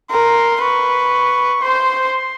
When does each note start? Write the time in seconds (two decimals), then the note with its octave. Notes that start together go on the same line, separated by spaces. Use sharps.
0.10 A#4 C6
0.61 B4 C#6
1.62 C5 C6